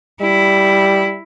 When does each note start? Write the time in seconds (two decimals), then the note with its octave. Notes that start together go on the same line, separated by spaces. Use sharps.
0.22 G3 E4